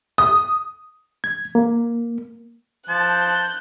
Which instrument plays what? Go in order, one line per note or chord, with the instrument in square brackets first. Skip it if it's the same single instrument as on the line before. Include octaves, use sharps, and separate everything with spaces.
[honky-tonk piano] D#6
[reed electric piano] G#6
A#3
[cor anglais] F3 [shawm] A5 [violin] F#6 G6